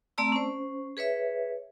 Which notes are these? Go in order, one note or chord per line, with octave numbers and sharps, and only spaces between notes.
A3 C4 D5 A5 A#5 E6
C#4 C5
G#4 B4 C#5 E5